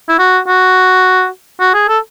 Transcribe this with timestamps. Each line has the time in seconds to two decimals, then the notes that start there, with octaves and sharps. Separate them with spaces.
0.09 E4
0.19 F#4
0.47 F#4
1.61 F#4
1.74 G#4
1.88 A4